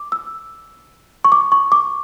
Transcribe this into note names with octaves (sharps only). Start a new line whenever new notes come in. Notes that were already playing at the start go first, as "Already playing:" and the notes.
Already playing: D6
E6
C#6
D6
C#6
D6